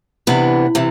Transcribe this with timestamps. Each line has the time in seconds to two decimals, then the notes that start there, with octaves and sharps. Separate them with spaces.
0.27 C3 E3 B3 D4
0.75 C3 E3